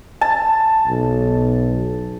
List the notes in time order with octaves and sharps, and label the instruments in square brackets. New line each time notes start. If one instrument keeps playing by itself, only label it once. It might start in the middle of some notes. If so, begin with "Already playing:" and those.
[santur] A5
[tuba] B1